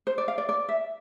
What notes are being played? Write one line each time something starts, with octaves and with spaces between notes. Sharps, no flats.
C5
D5
F5
D5
D5
E5